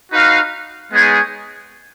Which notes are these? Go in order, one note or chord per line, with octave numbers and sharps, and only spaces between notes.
D#4 F#4 B4 F5
G#3 B3 D#4 G#4 C#5